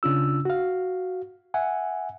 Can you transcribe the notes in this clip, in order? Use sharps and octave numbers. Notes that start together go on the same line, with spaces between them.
C#3 D4 F4 E6
F#4 F5
E5 F#5 G#5